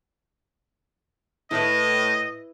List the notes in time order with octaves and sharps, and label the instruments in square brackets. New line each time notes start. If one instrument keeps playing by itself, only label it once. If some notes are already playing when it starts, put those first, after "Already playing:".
[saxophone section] A2 [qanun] E4 B4 [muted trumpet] D#5